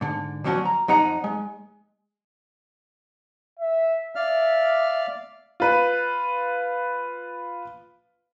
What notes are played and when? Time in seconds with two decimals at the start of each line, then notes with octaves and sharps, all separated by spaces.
0.01 G#2 D3
0.44 D2 F3 F#3 C#4 F#4
0.65 A#5
0.88 F2 D#4 F#5 A#5
1.24 G#3
3.60 E5
4.15 D5 E5 F5 F6
5.60 F4 B4